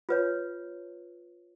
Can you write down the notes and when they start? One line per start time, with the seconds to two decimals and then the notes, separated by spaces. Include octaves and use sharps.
0.09 F4 B4 C#5